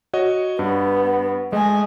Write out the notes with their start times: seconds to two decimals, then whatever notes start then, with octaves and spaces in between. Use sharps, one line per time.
0.13 F#4 C#5 D#5
0.59 G2 B3
1.52 G#3 A3 D#5 G#5